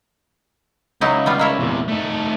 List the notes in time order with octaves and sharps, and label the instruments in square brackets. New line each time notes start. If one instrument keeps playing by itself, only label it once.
[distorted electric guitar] C#2 [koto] F#3 D#4 E4
[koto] G3 B3 F4
A#3 E4 C#5
[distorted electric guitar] E2 C3
A3 D#4